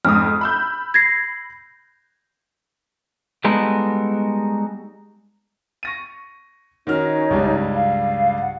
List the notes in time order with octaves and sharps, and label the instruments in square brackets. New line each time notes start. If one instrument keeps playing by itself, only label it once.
[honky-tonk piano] F2 G#2 D#6 [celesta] F6
[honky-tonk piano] B5 E6 G6
[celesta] G#6 A#6 C7
[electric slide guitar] G3 G#3 B3 D#4 F#4 A4
[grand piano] C#6 A#6 D#7
[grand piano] D#3 F#4 F6 [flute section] C#4 D#4 C#5
[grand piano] C#2 G2 G3
[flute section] F5
F#5